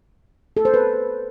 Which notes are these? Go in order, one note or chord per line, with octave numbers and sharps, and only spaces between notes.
A4
C5
B4